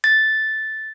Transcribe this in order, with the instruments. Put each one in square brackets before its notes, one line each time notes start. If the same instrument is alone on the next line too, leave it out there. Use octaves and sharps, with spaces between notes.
[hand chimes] A6